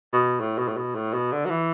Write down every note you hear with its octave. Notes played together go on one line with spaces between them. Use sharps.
B2
A2
B2
A2
B2
A2
B2
D3
F#3
E3